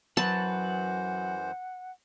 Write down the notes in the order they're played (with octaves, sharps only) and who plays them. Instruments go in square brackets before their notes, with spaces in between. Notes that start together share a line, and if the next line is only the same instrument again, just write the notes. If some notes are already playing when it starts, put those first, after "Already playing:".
[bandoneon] F#2 E3 C5 [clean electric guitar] F#3 B4 [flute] F#5 [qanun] A5